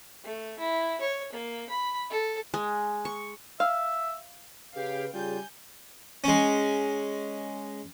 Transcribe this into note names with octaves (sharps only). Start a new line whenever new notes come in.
A3
E4
C#5
A#3
B5
A4
G#3
C#6
E5 F5
C#3 G4 B4 F5 G5
C#3 G3 F4 G#4 G#5 G6
G#3 C#4